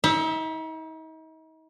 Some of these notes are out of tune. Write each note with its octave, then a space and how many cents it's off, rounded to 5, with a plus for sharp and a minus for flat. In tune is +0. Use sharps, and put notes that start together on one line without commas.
D#4 +40 E5 +0